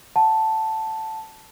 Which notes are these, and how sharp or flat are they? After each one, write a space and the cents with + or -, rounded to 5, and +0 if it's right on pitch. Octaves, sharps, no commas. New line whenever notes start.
F#5 +0 A5 +0